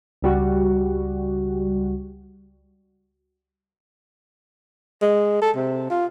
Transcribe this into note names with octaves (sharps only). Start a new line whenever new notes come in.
C#2 G3 F#4
G#3
A4
C3
F4